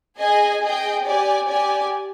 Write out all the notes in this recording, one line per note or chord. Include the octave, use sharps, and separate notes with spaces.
G#4 D#5 G#5
G#4 D#5 G5
G4 D5 G#5
G4 D5 G#5